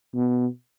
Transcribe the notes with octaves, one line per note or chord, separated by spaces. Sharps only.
B2